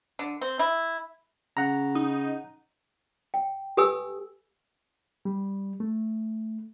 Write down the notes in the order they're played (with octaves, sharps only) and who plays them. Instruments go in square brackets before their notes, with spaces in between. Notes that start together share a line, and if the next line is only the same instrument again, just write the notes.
[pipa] D3
C4
E4
[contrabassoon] C#3 [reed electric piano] F#5 A#5
[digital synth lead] D#4
[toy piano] G5
G4 A4 B4 G#5 D#6 E6
[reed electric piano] G3
A3